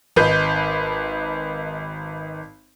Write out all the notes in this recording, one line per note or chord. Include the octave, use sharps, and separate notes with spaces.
G#1 D#4 B4 G6